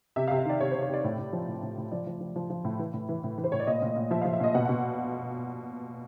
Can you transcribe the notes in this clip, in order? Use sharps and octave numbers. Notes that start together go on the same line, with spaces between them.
C3 E5
C3 F5
E5
D#3 D5
C3 C#5
C3 C5
C#5
C3 D5
A2
A2
F3
A2
A2
A2
F3 D5
F3
F3
F3
F3
A2
E3
A2
E3
A2
E3
C5
A2 C#5
D5
A#2 D#5
A#2
A#2
F3 E5
F3 F5
E5
A#2 D#5
B2 F#5
B2 F#5